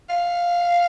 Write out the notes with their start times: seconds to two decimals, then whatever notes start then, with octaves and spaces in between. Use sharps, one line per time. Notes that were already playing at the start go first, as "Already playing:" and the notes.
0.09 F5